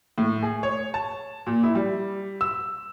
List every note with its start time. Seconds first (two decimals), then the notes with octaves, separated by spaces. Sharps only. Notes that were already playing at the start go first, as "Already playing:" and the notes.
0.18 A2
0.43 G#4
0.63 C#5
0.94 A5
1.47 A#2
1.63 E4
1.75 G3
2.41 E6